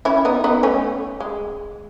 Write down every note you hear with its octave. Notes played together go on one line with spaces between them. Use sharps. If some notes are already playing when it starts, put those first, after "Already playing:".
C#4 E4
B3 D#4
B3 D#4
A3 C#4
G#3